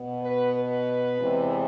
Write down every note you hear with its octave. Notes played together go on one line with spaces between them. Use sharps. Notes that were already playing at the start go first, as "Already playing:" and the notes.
Already playing: B2 B3
B4
B4
E2 C3 E3 G#3 C4